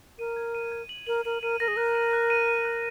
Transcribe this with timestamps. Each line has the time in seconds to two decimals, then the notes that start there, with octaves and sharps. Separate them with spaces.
0.19 A#4 D#7
0.36 G#6
0.55 D#7
0.72 G#6
0.89 F#7
1.07 A#4 F#7
1.25 A#4 D#7
1.42 A#4 D#7
1.60 A#4 A#6
1.68 G#4
1.76 A#4 F#6
1.95 D#7
2.13 F#6
2.30 D#7
2.48 D#7
2.65 F#6